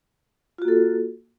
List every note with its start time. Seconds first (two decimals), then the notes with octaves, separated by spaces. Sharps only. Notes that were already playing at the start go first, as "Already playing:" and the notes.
0.58 F4
0.62 F#4
0.65 A#3
0.68 A4